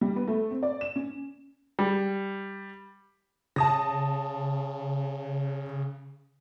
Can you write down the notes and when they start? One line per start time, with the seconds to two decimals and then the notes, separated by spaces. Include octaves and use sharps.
0.01 G3
0.16 B3
0.28 A3
0.51 C4
0.63 D5
0.81 E7
0.96 C#4
1.79 G3
3.56 C#3 A5 D#6 A#6